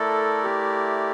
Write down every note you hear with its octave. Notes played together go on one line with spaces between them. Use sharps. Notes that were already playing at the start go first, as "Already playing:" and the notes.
Already playing: A3 E4 A4 A#4 D5
G4